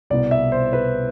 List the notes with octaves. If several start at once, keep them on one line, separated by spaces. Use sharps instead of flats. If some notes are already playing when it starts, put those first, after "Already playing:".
C2 B2 B3 D5
E5
C5
B4